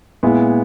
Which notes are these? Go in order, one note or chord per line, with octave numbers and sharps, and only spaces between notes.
A#2 G#3 B3 E4